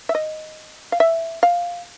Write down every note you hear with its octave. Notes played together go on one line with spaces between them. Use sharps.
E5
D#5
F5
E5
F5